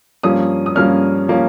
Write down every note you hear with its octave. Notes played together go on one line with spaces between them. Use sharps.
G2 F3 A#3 C#4 D#6
D#6
G2 F3 A#3 C#4 F6
F3 A#3 C#4